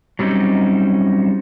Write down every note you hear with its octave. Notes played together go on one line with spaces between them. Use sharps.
F#3 G3 C4 C#4 D#4